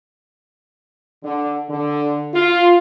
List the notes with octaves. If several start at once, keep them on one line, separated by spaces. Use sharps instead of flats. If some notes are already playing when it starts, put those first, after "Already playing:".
D3
D3
F4